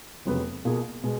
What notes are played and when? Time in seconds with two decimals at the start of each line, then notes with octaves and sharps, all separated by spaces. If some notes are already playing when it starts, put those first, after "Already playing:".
0.25 F1 F2 C#3 F#3 B3
0.65 B2 A#3 F4 G#4
1.03 B2 G#3 B3